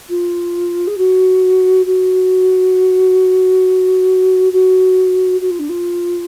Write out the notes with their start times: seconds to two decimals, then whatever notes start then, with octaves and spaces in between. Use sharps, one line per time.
0.09 F4
0.87 G#4
0.97 F#4
1.86 F#4
4.52 F#4
5.41 F#4
5.50 F4
5.59 D4
5.69 F4